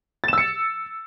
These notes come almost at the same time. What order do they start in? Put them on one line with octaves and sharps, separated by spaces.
A6 E7 E6 C#7